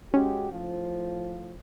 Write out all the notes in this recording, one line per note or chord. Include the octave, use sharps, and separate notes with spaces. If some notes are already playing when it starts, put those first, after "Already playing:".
G#3 C#4 F#4 G4
A2 F3